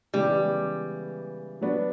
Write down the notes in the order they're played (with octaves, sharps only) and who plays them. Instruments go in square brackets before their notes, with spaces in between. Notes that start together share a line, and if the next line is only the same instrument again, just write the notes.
[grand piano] C#3 E3 G#3 B3 [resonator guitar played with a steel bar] G3
[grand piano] F#3 B3 D4 F#4